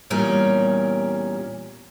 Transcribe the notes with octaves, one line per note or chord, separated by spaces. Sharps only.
E2 A#2 G3 C#4 A#4